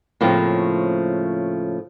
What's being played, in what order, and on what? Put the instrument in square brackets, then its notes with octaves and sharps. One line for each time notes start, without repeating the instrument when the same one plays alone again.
[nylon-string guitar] A2 C#3 F3 A#3 C4